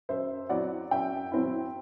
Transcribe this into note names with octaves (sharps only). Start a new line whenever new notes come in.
F#2 C5 E5
F#3 C4 E4 D5 F#5
F#2 E5 G5
F#3 C4 E4